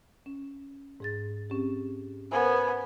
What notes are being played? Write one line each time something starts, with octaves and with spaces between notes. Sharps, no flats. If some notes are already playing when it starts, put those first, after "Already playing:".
C#4
G#2 G#4 A6
C4 C#4 G4
B3 A#4 C5 G#5